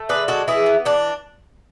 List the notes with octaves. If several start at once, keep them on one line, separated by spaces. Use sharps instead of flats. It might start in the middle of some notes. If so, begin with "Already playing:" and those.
Already playing: A3
D3 G#4 B4
G#3 F#4 A4
E3 E4 G#4
B3
E3 D4